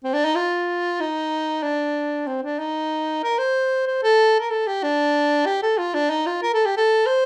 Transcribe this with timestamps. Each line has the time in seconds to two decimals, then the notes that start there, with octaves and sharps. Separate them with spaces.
0.04 C4
0.14 D4
0.25 D#4
0.35 F4
1.00 D#4
1.63 D4
2.27 C4
2.43 D4
2.59 D#4
3.24 A#4
3.39 C5
3.87 C5
4.03 A4
4.40 A#4
4.50 A4
4.67 G4
4.83 D4
5.46 G4
5.63 A4
5.78 F4
5.94 D4
6.10 D#4
6.27 F4
6.42 A#4
6.54 A4
6.66 G4
6.77 A4
7.06 C5